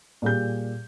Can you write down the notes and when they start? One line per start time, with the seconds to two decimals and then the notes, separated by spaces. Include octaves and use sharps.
0.22 A#2 G3 G#4 G6